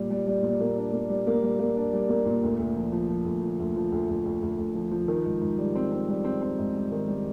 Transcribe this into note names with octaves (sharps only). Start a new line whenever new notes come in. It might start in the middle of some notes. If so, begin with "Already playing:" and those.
Already playing: A#2 G3
G3
G3
A#2
A#3
D4
A#3
G3
A#3
G3
A#3
D4
G3
A#3
A#2
D2
D2
F3
F3
F3
D2
F3
D2
F3
D2
D2
D2
D2
D2
F3
F3
D#3
G#2
G#2
G3
C4
C4
G3
C4
C4
G#2
G3
D#3
G3